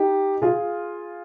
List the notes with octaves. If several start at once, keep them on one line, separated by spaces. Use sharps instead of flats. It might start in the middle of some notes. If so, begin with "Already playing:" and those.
Already playing: D#4 G4
F4 G#4